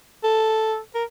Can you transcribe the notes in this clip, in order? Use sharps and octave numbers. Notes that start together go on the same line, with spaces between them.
A4
A#4